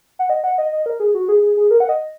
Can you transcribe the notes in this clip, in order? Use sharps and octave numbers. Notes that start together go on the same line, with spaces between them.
F#5
D#5
F#5
D#5
D#5
A#4
G#4
F#4
G#4
G#4
G#4
A#4
F#5
D#5